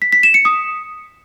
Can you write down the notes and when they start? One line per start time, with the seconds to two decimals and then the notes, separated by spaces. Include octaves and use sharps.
0.02 B6
0.12 B6
0.23 E7
0.34 C#7
0.45 D#6